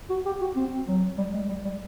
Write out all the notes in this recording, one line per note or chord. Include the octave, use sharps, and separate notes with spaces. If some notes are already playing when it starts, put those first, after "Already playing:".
F#4
G4
F#4
C4
F#3
G3
G#3
G3
G3